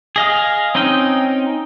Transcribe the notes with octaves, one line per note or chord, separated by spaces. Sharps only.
G#4 D#5 F5
C4 C#4 D#4 D#5 G5